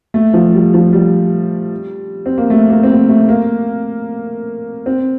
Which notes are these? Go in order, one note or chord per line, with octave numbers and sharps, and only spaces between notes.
A3
F3
G3
F3
G3
C4
A#3
A3
A#3
C4
A#3
A3
A#3
C4